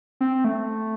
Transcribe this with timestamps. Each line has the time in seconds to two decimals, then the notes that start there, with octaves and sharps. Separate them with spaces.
0.21 C4
0.45 A3